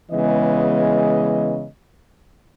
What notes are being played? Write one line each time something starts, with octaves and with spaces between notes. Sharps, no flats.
C#3 E3 G#3 B3 D#5